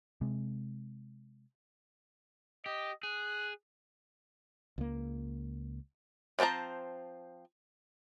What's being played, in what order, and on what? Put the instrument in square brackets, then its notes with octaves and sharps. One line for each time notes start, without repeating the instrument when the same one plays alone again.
[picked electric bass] C3 G#3
[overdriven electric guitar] G4 [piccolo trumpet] D#5
[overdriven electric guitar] G#4 [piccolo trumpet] F#6
[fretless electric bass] C#2 A#3
[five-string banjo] F3 C4 C5 A5 A#5